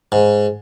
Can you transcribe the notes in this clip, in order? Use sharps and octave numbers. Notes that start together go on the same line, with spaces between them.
G#2